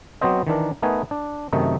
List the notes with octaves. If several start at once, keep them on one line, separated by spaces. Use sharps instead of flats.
F#3 B3 C4 C5 D#5
D#3 E3 D4 A#4
A3 B3 D#4 A#4 B4 G#5
D4
F#2 C3 D#3 A3 D#4